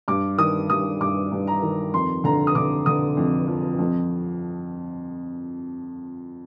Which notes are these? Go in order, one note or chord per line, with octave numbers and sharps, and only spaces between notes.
G2 D6
D#3 D#6
G2 D#6
G2 D6
G2
A#5
D#3
F2 C6
D3 A#5
D#6
D3 D6
D3 D#6
F2
F3
F2